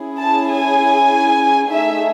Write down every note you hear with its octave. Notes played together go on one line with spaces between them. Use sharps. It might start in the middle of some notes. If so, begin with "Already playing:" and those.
Already playing: C#4 E4 G#4
A5
G#5
A3 D#4 G#4 E5